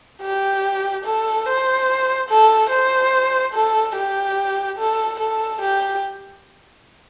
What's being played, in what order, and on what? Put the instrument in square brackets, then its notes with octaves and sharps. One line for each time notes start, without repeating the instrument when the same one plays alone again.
[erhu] G4
A4
C5
A4
C5
A4
G4
A4
A4
G4